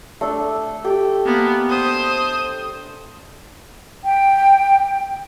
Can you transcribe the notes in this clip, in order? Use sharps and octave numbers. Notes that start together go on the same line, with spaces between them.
A3 D4 A4
G4 A4 G5
A#3 B3
C5 D#6
G5